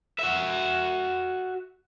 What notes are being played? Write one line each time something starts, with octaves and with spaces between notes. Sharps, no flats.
F#4 E5